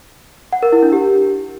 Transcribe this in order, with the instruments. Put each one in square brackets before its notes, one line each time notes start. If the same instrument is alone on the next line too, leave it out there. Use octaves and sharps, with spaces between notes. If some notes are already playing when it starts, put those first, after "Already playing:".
[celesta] F#5
A#4
E4
D4
G4